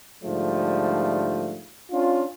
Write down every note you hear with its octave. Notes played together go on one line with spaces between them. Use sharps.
G#2 D3 F3 G3 A3
C#4 D4 F4